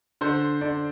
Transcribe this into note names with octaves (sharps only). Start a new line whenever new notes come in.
D3 C5
D3 D5